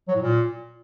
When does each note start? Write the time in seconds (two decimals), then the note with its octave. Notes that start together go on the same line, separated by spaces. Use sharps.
0.08 F#3
0.15 A2
0.22 A#2